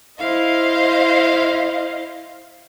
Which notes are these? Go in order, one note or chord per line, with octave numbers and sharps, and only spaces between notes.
E4 C5 D#5 F5